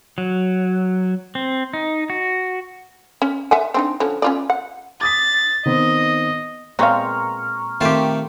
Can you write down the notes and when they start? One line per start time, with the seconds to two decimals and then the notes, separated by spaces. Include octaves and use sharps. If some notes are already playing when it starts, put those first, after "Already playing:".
0.18 F#3
1.35 C4
1.73 D#4
2.10 F#4
3.22 C#4
3.51 E5 F#5 G#5
3.74 C4 D4 D#4
4.00 D3 F3 C#4
4.22 C#4 F4 D5
4.50 F#5
5.01 D6 D#6 A6 B6
5.66 D#3 B3 C4 D#5
6.79 A#2 G#3 B3 C4 F5 A#5 C#6 F6
7.81 D#3 A3 C4 F4 G4